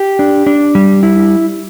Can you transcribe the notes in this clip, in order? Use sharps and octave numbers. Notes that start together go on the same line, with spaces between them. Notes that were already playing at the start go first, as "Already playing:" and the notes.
Already playing: G4
D4
D4
G3
E4